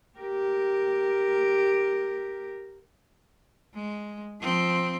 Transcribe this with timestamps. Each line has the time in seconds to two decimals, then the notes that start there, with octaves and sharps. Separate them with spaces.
0.19 G4 A#4
3.74 G#3
4.41 F3 C4